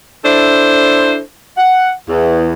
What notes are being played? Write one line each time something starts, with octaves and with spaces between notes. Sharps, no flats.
D4 E4 A4 C5
F#5
E2